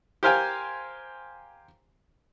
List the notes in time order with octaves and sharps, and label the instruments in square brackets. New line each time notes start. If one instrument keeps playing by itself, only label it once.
[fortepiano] G4 A#4 C5 F5 G5 G#5